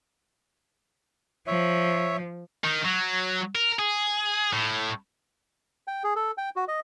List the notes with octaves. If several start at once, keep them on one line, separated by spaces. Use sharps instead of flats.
F3 C#5 E5
D#3
F#3
A#4
G#4
A2
G5
G#4
A4
G5
F#4
D#5